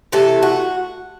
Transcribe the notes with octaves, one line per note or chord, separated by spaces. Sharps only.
C3 E3 A3 A4
F#4